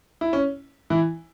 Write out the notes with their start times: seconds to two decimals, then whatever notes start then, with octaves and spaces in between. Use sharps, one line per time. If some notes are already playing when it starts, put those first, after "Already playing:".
0.21 E4
0.33 C#4
0.90 E3 E4